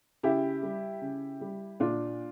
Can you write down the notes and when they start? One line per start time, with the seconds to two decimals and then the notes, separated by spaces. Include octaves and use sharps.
0.23 C#3 E4 G4
0.63 G3
1.01 C#3
1.41 G3
1.80 A#2 D4 F4